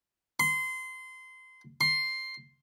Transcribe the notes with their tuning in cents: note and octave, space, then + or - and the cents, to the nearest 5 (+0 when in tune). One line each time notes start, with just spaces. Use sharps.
C6 -20
C6 +5